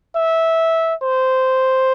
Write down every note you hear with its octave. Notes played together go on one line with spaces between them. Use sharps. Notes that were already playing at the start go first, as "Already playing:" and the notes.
E5
C5